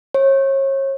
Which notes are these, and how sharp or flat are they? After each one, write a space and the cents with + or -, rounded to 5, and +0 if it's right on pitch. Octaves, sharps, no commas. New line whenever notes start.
C#5 -35